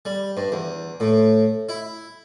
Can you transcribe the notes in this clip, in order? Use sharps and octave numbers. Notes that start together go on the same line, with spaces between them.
G3
G2
E2
A2
E4